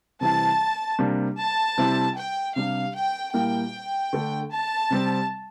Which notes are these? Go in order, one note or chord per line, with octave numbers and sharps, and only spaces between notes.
C3 E3 G3 C4 E4 A5
C3 G3 A#3 D4
A5
C3 G3 C4 E4
G5
C3 G3 D4 F5
G5
A#2 G3 A#3 E4 G5
D3 A3 D4
A5
C3 G3 C4